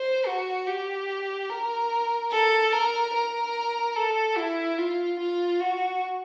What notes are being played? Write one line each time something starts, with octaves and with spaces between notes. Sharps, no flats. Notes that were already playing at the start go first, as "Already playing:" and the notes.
Already playing: C5
F#4
G4
A#4
A4
A#4
A#4
A4
E4
F4
F4
F#4